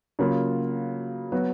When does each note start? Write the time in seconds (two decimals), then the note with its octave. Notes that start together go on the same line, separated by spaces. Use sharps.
0.19 C#3 F#3 A#3 F4
1.32 F#3 B3 F#4